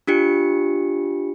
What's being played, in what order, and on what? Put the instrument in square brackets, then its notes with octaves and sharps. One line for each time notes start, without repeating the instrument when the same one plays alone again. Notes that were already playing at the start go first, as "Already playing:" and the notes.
[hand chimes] D4 F4 G4 C#7